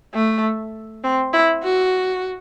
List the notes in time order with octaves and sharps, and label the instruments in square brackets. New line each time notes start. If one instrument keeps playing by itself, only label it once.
[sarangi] A3
C4
E4
F#4